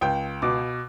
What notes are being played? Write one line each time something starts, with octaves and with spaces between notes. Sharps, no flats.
C#2 G5
B2 D6